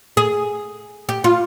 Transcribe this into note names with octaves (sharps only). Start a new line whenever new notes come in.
G#4
G4
F4